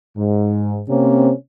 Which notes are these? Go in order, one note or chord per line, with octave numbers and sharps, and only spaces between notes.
G#2
C3 A#3 C4 C#4